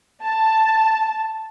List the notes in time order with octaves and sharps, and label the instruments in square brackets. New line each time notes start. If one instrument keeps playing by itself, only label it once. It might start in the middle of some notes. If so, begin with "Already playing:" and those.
[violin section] A5